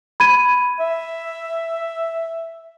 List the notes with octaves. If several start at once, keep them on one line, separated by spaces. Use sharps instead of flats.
B5 G#6 D#7
E5